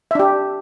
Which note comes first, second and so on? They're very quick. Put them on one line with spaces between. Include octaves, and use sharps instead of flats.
E5 D4 G4